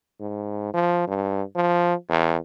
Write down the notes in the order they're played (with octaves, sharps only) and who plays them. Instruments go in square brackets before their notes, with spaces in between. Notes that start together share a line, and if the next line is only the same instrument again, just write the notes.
[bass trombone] G#2
F3
G2
F3
E2